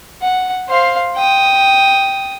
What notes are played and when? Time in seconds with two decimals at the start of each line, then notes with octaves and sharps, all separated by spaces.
0.22 F#5
0.69 C5 F5
1.16 G5 D#6